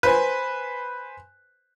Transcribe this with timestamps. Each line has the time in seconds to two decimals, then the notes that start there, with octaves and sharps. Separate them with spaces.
0.03 B4 C5 G#5